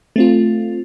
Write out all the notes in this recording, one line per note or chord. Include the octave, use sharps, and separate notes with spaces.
A3 C4 F4